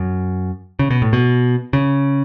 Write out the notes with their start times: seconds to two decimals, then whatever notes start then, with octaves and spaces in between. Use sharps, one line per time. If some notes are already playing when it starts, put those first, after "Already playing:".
Already playing: F#2
0.79 C#3
0.90 B2
1.02 A2
1.13 B2
1.73 C#3